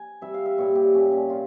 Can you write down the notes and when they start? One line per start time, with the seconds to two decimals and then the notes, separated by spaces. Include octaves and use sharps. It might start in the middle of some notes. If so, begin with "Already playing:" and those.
Already playing: G#5
0.22 C3 G3 E5
0.34 F5
0.46 E5
0.58 A#2 G3 C#5
0.75 G4
0.94 A#2 G3 C#4
1.12 C#4
1.30 C3 F4